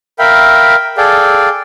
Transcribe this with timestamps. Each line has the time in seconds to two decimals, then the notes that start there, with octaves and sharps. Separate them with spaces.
0.19 A#4 E5 F5 G5 B5
0.97 G#4 A4 D5 F5 G5